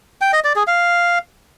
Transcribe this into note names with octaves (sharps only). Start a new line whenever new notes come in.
G5
D#5
D5
G#4
F5